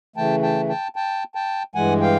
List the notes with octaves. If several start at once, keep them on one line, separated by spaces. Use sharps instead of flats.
C#3 E3 A3 G5 A5
G5 A5
G5 A5
G5 A5
G5 A5
G2 E3 G#3 F#5 G#5
F5 G5